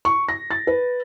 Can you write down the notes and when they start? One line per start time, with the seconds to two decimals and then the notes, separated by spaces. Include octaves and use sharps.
0.05 C#6
0.29 A#6
0.51 A6
0.67 B4